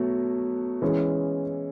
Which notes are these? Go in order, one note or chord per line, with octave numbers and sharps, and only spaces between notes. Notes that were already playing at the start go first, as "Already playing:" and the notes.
Already playing: B2 F#3 A3
E3 G#3 C#4